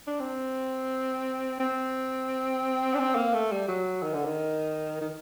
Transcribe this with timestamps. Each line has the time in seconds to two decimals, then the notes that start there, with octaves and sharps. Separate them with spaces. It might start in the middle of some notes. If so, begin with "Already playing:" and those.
0.07 D4
0.20 C4
1.60 C4
2.94 D4
2.99 C4
3.16 A#3
3.34 A3
3.52 G3
3.68 F#3
4.03 D#3
4.14 D3
4.25 D#3
5.01 D#3